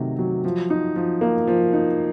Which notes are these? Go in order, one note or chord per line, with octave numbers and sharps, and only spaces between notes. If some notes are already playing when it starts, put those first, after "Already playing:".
Already playing: C3 D#3 F#3 A3
F#3
F3
D#4
F3
A#3
F3
D#4